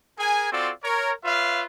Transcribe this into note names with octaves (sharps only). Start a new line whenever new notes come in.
G#4 A#4 G#5
C4 F4 F#4 A4 D5
A#4 C#5
F4 B4 C#5 E5 F5